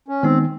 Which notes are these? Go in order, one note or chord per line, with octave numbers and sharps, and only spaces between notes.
C#4
D#3 G#3 B3 C4 D#4